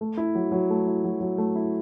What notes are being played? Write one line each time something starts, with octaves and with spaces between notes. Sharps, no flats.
A3
E4
F#3
F#3
A3
E4
F#3
F#3
A3
E4